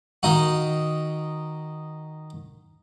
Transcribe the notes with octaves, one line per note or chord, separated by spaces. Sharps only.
D#3 D#4 F#4